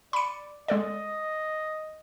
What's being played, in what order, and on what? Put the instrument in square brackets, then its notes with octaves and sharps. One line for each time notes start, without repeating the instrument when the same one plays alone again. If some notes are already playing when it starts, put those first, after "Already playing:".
[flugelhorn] D5 [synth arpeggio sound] B5 C#7
[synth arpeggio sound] G#3 A4 D5 [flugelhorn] D#5